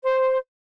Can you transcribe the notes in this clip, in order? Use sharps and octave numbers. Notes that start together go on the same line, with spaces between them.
C5